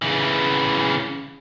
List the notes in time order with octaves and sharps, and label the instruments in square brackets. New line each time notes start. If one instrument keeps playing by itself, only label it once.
[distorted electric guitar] C#3 E3